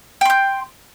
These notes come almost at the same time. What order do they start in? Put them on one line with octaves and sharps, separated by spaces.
G5 C6 G6